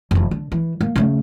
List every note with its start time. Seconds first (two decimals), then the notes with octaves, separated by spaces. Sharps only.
0.11 F1 E2
0.31 D3
0.52 E3
0.81 A#3
0.96 C#3 A3